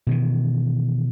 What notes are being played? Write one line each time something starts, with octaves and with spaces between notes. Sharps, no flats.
B2 D#3 E3